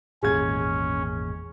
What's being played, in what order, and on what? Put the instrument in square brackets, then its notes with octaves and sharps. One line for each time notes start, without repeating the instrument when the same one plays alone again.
[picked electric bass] G#1 E2 A#2 [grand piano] G#3 G#4 G#6 [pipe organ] C#4